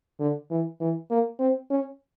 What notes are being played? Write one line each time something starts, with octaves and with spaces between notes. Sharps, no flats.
D3
E3
E3
A#3
C4
C#4